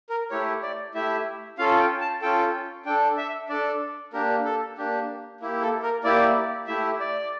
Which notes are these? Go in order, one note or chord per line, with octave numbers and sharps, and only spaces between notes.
A#4
A3 E4 G4 C#5
D5
A3 E4 G4 E5
C#4 F4 A4 F5
G5
A5
C#4 F4 A4 G5
D4 A4 G5
E5
D4 A4 D5
A#3 D4 G4 A#4
A4
A#3 D4 G4
A#3 E4 G4
A4
A#4
A#3 E4 G4 D5
A3 E4 G4 E5
D5